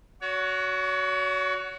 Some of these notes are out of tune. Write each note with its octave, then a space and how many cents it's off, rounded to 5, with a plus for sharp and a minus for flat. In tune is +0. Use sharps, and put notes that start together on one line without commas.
F#4 +0 C#5 +35